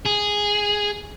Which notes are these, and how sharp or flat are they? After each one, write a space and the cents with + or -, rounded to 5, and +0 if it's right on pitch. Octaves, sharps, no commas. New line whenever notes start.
G#4 -5